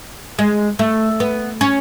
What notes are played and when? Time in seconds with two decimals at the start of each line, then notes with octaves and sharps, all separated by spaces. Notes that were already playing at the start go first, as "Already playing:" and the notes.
0.39 G#3
0.79 A3
1.20 B3
1.61 C#4